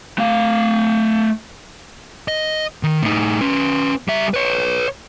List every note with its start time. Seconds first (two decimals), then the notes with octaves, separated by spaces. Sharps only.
0.18 A3 F5
2.28 D#5
2.83 D#3
3.02 A2 D#4
3.41 C#4 B4
4.08 G3 E5
4.34 B4 C#5